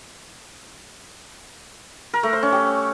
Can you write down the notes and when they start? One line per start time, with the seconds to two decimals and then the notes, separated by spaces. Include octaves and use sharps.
2.14 A#4
2.23 A3
2.33 C5
2.43 C#4
2.52 G4